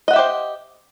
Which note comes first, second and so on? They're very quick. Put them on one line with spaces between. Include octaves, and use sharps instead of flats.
D#5 F#5 E5 G4 C5